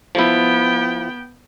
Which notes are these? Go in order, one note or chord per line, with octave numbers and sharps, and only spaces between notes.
F3 B3 E4 G5